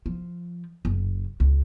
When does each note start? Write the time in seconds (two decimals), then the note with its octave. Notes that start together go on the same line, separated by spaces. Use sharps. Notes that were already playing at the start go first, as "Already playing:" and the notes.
0.06 F3
0.85 F#1
1.40 C#2